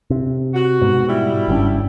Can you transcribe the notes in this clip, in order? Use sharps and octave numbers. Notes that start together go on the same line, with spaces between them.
C3
F#4
G#2 B2
G3 E4
F#1 G2 C#4